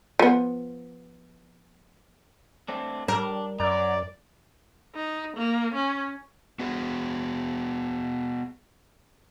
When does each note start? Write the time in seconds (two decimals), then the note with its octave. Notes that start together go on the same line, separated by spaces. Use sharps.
0.19 F3 B3
2.68 A3 C4 D4
3.08 G3 D4 A#4
3.60 F#2 F#3 D5 A#5
4.95 D#4
5.37 A#3
5.74 C#4
6.60 B3 F#4 G#4